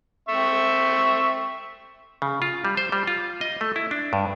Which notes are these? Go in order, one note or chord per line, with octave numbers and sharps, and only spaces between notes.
C4 E5 C#6
C#3
F4
G3
C5
G3
F4
D#5
A3
E4
D4
G2